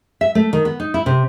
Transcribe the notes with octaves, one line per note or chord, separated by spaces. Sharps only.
E5
A3
D#3
B3
D#4
E4
C3